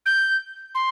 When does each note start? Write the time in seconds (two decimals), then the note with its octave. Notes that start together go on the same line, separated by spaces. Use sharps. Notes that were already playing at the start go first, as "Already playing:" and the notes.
0.05 G6
0.74 C6